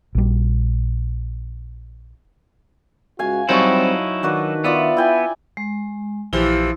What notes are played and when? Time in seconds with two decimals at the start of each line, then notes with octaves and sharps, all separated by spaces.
0.15 A#1 G3
3.19 C#2 F#4 F5 G#5
3.49 F#3 G3 C4 D#4 E4 C5 A5 C#6
4.23 D#3 D4 F#4 B4
4.64 B3 F4 D5 E5
4.97 E4 G5 G#5
5.57 G#3
6.33 A#1 E3 F3 E4 G4